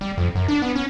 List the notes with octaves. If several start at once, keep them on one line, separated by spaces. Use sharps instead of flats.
G3
F2
F#2
D4
B3
C#4